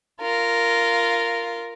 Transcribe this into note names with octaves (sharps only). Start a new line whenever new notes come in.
F4 A#4